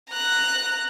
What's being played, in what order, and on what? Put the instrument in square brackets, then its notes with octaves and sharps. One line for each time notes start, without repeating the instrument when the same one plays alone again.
[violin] A#5 F#6